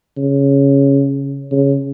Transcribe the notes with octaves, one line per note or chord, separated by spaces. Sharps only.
C#3
C#3